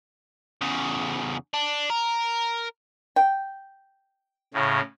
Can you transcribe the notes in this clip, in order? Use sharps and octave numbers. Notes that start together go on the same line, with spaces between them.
E2 C#3
D4
A#4
G5
A2 C#3